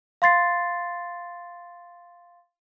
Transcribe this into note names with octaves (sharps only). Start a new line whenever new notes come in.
F5 C6 A6 C7